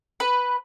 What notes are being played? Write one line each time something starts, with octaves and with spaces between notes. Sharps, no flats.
B4